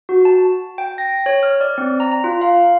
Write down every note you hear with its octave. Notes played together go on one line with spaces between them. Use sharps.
F#4
A5
G5
A#6
C#5
F6
D5
C4
A#5
A#5
F4
F5